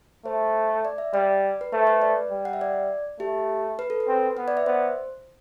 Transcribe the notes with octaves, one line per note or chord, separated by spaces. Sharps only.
A3 C5
D5
E5
G3 D5
B4
A3 C5
B4
D5
G3
F#5
E5
D5
A3 G4
B4
A4
B4
C4
B3 B4
D5
E5
B3 C5